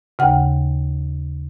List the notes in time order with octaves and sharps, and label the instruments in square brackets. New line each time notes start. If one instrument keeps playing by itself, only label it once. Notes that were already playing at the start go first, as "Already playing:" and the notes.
[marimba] D#2 C#3 F#5